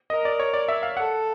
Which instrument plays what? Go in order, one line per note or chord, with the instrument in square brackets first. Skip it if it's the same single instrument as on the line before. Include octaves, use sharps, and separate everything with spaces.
[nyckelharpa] A#4 [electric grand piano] D#5
[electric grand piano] D5
C#5
D5
E5
F5
[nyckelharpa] A4 [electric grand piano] F#5